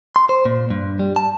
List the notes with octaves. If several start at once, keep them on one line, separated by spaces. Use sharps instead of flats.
C6
C5
A#2
G2
G3
A5